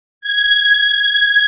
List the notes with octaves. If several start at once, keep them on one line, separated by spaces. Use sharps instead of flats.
G#6